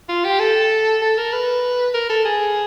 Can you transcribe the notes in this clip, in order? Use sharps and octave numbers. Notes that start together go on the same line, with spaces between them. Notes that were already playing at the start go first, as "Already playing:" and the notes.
F4
G4
A4
A4
A#4
B4
A#4
A4
G#4